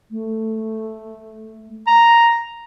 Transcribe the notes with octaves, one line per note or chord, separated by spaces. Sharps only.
A3
A#5